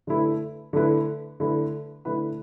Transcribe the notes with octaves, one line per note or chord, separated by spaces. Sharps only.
D3 A3 E4 B4
D3 A3 E4 B4
D3 A3 E4 B4
D3 A3 E4 B4